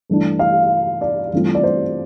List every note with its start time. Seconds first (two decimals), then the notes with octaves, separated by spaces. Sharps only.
0.10 G2 E3 A3 D4
0.39 F5
1.01 D5
1.33 G2 E3 A3 C4 F4
1.55 D5
1.63 C5